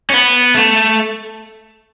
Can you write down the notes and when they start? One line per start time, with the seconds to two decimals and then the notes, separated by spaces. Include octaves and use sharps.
0.10 C#4
0.14 B3
0.55 A3